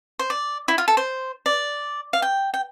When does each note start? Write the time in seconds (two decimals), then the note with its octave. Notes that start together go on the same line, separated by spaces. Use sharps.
0.19 C5
0.30 D5
0.68 E4
0.78 F4
0.88 A4
0.97 C5
1.46 D5
2.13 F5
2.22 G5
2.54 G5